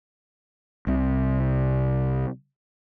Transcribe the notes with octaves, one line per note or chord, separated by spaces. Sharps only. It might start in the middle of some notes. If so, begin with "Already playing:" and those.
C2 C3